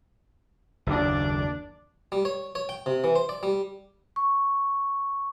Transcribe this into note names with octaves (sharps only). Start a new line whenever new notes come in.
F#1 D#2 D#3 D4 D5
G3
C#5
C#5
G5
C3
E3
C5
D5
G3
C#6